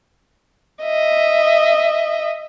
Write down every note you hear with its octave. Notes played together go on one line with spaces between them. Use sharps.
D#5 E5